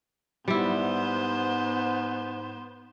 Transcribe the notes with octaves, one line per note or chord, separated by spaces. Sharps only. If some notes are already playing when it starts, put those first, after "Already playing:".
G#2 G3 B3 E4 C5